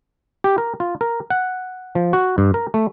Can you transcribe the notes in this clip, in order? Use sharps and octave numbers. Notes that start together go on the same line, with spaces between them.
G4
A#4
F4
A#4
F#5
F3
F#4
G2
A#4
A3